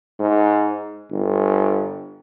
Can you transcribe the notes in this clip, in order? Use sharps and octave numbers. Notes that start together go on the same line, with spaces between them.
G#2
G1